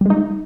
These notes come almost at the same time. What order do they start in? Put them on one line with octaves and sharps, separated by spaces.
G3 G#3 D#4